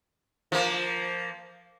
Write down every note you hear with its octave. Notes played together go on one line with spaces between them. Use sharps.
F3 A#3